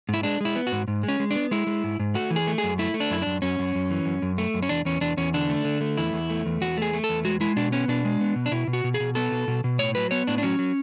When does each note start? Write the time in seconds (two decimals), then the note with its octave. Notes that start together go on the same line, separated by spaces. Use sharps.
0.09 G#2 E4
0.23 G#3 D4
0.41 G#3 E4
0.56 B3
0.67 F#4
0.72 G#2
0.88 G#2
1.03 G#3
1.08 C#4
1.20 G#3
1.31 B3 D4
1.51 G#3 E4
1.67 G#3
1.84 G#2
2.00 G#2
2.15 A3 F#4
2.30 E3
2.36 G#4
2.47 A3
2.58 G#4
2.63 F#2
2.78 A3 E4
2.94 A3
3.00 D4
3.10 F#2 E4
3.22 F#2 D4
3.42 F#2 C#4
3.59 F#2
3.75 F#2
3.91 E3
4.06 F#2
4.22 F#2
4.38 A3
4.54 F#2
4.63 C#4
4.69 E2 D4
4.85 E2 C#4
5.01 E2 D4
5.17 E2 C#4
5.34 D3 D4
5.50 A3
5.65 D3
5.81 A3
5.97 E2 E4
6.13 E2
6.30 A3
6.46 E2
6.61 E2 F#4
6.77 A3 G#4
6.93 A3
7.04 A4
7.09 E2
7.25 G#3 F#4
7.40 G#3 E4
7.56 B2 D4
7.72 B3 C#4
7.88 B2 D4
8.05 G#3
8.21 B3
8.36 B2
8.46 D4
8.51 B2 E4
8.67 B2
8.73 F#4
8.84 B2
8.94 G#4
9.00 B2
9.15 B3 A4
9.32 B2
9.48 B2
9.64 B2
9.79 A2 C#5
9.95 F#3 B4
10.11 B3 C#5
10.27 A2 D4
10.38 D4
10.43 F#3 C#4
10.59 F#3